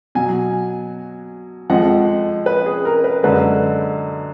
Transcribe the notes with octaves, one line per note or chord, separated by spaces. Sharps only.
B2 F#3 G#5
F2 F3 G#3 F#5
B4
G#4
A#4
B4
F#2 D3 G#3 B4